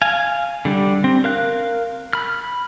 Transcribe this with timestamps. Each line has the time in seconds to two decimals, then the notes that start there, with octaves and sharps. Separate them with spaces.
0.02 F5 G#5
0.65 D3 G3 D4
1.04 C4
1.24 A#4 F5 F#6
2.13 B5 F6